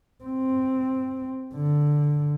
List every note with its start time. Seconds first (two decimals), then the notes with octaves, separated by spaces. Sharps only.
0.25 C4
1.55 D3